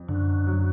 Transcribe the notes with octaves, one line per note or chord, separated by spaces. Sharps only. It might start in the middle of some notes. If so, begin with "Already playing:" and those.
Already playing: F2
F#2 D3
F#3